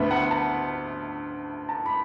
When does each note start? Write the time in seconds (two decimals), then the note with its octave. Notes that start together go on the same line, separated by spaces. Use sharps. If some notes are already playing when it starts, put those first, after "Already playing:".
Already playing: D2 D3 B3 E5
0.11 F#5
0.31 A5
1.69 A5
1.86 B5